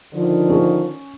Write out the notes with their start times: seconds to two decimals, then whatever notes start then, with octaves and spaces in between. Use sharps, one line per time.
0.13 D3 D#3 F3
0.50 C#4